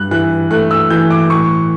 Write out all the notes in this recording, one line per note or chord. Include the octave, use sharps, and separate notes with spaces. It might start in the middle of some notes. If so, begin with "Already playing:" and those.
Already playing: G2 F#6
E3 F#6
A3 F#6
E6
E3 G6
D6
A2 C#6